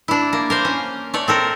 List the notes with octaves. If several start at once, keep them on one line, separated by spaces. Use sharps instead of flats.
D4 E4
A#3
A#4 C5 F5
C#4
A3 C#5 D5
C4 A4 A#4